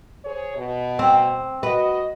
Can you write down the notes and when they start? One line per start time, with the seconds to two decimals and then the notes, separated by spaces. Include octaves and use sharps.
0.25 G#4 C5 C#5
0.56 B2
0.99 C4
1.63 F#4 B4 D#5